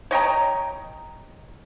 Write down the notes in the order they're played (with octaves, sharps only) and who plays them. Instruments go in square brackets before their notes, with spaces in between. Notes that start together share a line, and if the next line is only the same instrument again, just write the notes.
[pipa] C#5 D#5 G5 A#5